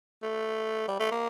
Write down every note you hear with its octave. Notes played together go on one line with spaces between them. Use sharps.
A3
G3
A3
A#3